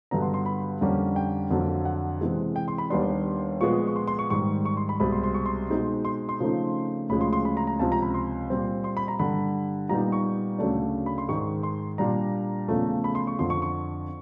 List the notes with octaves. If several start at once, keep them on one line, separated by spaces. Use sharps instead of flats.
G2 D3 F#3 B3 D4 A#5
C6
C6
B5
F2 D3 G3 A#3 C#4
G5
F2 D3 F#3 A#3
F#5
C3 E3 G#3
G5
C6
B5
D#2 D#3 G3 B3 D4 C6
A#2 F3 G#3 B3 C#6
C#6
C6
C6
C#6
G#2 D#3 G3 C#6
C#6
C6
B5
C2 B2 G#3 C4 B5
C6
C6
C#6
C6
B2 G#3 C4 D#4
C6
C6
C#3 F3 A3 C4 D#4
D2 C#3 F3 G#3 B5
C6
C6
B5
A#5
A#5
C#2 C3 F3 A5
A#5
B5
C6
A#2 G3 C4
C6
B5
A#5
G2 D3 G3 B5
A#2 G3 B3 D#4 A#5
C#6
D2 C#3 F#3 A3 D4
B5
C6
G#2 D#3 G#3 C#6
C6
A#2 G3 A#3 D4 A#5
E2 C#3 F3 A3
B5
C6
C#6
F2 D3 F3 C6
C#6
C#6